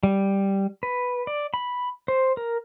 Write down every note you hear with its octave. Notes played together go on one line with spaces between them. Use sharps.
G3
B4
D5
B5
C5
A#4